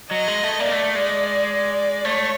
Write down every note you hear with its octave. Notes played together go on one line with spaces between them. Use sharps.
F#3 D#5
G#3
A3
A#3 D5
G#3
A3
A3
G#3
D5
A3 C#5